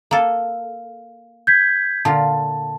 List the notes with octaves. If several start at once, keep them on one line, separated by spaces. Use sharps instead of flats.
A#3 A4
G6 G#6 B6
A#2 D3 F4 A5